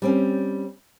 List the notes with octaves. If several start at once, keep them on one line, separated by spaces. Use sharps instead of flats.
G3 C4 C#4